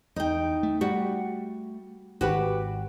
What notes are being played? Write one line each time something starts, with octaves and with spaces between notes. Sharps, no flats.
E2 D#4 G5
A3
G3 F#4
G#1 F#4 G4 B4